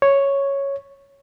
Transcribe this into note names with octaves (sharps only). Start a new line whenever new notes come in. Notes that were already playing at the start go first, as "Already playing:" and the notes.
C#5